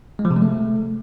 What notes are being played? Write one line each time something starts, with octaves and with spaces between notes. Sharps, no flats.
G#3
F3
C3
G#3
A3